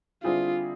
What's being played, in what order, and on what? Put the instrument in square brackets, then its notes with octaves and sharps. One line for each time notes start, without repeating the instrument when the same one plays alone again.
[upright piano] D3 G3 C4 E4 G#4 [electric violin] F4